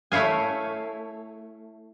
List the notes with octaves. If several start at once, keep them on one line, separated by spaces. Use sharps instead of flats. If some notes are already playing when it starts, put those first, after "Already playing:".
A3 E4 C#5 F5 G#5